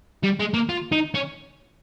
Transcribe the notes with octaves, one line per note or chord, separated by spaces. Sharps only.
G3
G#3
A#3
F4
D#4
C#4